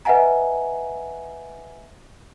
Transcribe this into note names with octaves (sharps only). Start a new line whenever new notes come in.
B4 D#5 E5 F#5 G#5 A#5